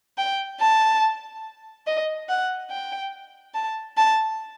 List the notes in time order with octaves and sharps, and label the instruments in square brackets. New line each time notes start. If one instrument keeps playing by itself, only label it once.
[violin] G5
A5
D#5
F#5
G5
A5
A5